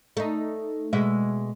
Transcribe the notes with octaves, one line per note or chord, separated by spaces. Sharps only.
A3 D#4
B2 G#3 E5